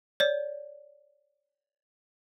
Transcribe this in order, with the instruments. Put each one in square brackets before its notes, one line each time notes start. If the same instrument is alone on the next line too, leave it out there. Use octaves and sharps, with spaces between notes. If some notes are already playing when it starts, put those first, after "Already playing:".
[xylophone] C#5 D5